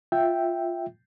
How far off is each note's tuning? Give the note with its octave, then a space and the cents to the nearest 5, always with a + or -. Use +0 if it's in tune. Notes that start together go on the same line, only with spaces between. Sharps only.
F4 +0 E5 +0 G5 +0